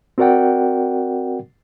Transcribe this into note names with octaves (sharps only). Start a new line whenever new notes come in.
C4 F#4 A#4 D5 F#5 G5